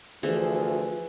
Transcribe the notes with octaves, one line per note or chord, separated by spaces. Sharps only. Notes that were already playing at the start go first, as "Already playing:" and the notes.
D2 E3 F3 F4 G#4